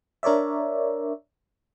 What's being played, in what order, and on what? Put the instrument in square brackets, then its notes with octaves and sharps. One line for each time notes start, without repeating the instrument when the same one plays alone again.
[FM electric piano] D4 A#4 C#5 D5 E5